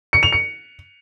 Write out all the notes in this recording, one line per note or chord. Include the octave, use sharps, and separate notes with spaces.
C#7
F7
C#7